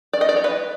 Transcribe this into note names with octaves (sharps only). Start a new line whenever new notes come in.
D5
D#5
D5
C#5
B4